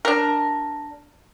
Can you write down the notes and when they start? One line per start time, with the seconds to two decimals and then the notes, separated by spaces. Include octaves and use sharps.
0.05 D4 A#4